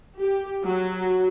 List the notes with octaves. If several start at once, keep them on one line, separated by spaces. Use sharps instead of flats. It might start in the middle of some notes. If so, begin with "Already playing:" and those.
G4
F#3